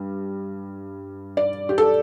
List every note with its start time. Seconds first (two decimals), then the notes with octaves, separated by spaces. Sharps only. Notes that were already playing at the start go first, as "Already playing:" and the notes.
Already playing: G2
1.37 D5
1.69 G4
1.78 A4